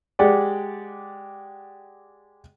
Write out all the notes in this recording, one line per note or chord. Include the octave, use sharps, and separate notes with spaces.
G#3 G4 D5 F#5